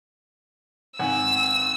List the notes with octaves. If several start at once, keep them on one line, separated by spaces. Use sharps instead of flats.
G#1 F#5 G#5 E6